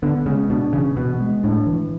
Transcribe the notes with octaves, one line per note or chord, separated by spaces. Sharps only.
D3 B3
C#3 G#3
B2 D4
C#3 E3
B2 B3
G#3
A2 D4
E3